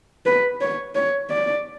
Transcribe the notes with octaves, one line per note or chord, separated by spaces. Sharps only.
B4
C#5
C#5
D5